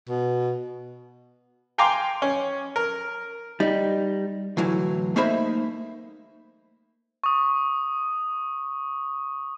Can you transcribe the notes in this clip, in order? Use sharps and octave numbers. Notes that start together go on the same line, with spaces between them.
B2
F5 G5 G#5 A#5 C6 D6
C#4
A#4
G3 D#4
D2 A2 E3 F#3
A3 A#3 D#4 C5 E5 B5
C#6 D#6